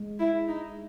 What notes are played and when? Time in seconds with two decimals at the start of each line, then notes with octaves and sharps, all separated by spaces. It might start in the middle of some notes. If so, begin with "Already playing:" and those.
Already playing: G#3
0.19 E4
0.48 D#4